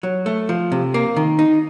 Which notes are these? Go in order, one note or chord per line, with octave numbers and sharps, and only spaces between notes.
F#3
A3
F3
C3
A#3
D#3
D#4